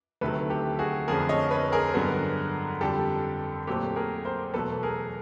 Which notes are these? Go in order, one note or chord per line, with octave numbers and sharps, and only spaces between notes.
D2 C3 D#3 F#3 A4 B4
G4 A4
F#4 G#4
F2 D3 F3 A3 G#4 A#4
C#5 D#5
B4 C#5
G#4 A#4
G2 D3 F#3 B3
F2 D3 G3 G4 A4
A#2 F#3 A3 C4 G4 A4
G#4 A#4
A#4 C5
E2 B2 F#3 A3 A4 B4
G#4 A#4